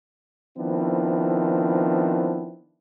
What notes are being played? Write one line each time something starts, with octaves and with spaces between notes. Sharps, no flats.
D#3 F3 B3 C4 D4 E4